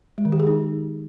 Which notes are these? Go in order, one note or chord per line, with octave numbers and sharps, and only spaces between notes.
G#3
D#3
G4
G#4
D#4